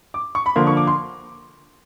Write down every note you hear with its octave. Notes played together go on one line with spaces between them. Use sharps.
D6
C#6
B5
D3 F3 A#3 C6
C#6
D6
C6